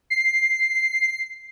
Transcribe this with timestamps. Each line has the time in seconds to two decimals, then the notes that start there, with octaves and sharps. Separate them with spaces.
0.10 C7